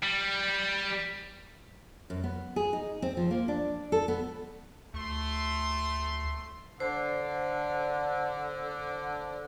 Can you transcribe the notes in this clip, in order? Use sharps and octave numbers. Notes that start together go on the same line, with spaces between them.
G3
F#2
B3
G#4
D#4
C4
F3
A#3
D4
A4
B3
D2 A3 C6
D3 C5